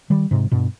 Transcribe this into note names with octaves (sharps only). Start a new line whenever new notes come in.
D#3 G3
G#2 C3
G2 B2